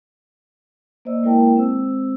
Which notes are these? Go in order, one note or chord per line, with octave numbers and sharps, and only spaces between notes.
A#3 C5 D5 D#5 E6
G#3 A#3 E4 A#4 G5 A5
G#3 C4 C5 E6